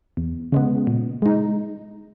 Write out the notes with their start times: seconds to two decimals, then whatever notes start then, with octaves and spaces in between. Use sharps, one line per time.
0.17 E2
0.52 C#3 G#3 B3
0.87 A#2
1.22 G#3 D#4